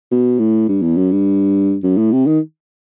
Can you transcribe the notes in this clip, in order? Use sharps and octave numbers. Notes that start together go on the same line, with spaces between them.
B2
A2
G2
E2
F#2
G2
F#2
A2
C3
D#3